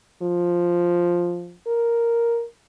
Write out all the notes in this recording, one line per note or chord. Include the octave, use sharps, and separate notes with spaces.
F3
A#4